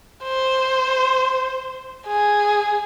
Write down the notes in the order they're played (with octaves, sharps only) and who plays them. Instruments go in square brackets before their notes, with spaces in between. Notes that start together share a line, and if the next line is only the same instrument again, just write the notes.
[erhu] C5
G#4